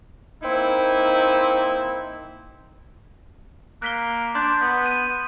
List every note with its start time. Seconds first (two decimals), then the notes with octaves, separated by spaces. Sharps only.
0.42 A#3 C4 D#4 E4
3.82 A#3 F#6 B6 G7
4.35 D4 C6 F#6 G6
4.61 B3
4.86 D#7